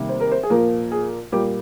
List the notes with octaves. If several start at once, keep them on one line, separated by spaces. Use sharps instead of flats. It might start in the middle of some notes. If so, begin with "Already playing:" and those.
Already playing: C3 D#3 G3 A#3
C5
A#4
C5
G#4
A#2 F3 A#3 A#4
G#4
A#2 G3 A#3 G4